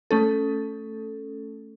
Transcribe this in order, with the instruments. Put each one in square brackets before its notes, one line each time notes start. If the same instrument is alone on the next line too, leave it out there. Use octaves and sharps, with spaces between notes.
[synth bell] A3 C#4 A4